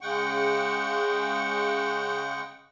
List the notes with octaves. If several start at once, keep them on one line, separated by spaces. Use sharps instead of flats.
C#3 G#3 F#5 G5 C#6